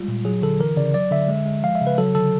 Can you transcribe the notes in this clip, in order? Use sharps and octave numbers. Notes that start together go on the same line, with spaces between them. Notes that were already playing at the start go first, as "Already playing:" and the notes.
Already playing: G3 G#3 F4
A#2
F#3 G#4
D3 A4
E3 A#4
C#3 D5
F#3 D5
D3 E5
G#3
G#3
F3 F5
E5
C#3
B4
F#3 A4
D3 A4